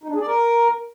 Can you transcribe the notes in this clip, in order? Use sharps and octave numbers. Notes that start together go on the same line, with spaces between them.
D#4
D4
G#4
D5
A#4